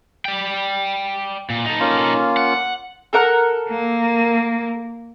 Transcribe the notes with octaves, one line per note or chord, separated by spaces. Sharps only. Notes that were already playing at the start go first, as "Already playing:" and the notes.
D5 G5
A#2
D#4 A4
A#3 C#4 F4
F#5
A4 A#4 F#5
A#3